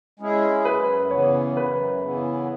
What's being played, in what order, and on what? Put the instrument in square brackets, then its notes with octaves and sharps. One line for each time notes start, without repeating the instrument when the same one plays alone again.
[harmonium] G#3 C#4 E4 G#4
[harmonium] F#2 [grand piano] B4
[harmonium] C#3 E3 B3 [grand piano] C#5
[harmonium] F#2 [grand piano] B4
[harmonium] C#3 E3 B3